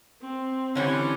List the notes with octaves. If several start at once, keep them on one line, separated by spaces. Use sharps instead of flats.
C4
D3 E3 G3 C#4